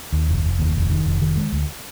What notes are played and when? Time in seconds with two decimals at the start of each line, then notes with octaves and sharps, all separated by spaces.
0.12 D#2
0.28 F1
0.44 F1
0.59 D#2
0.75 F1
0.90 D#3
1.06 F1
1.21 D#3
1.37 G#3
1.52 D2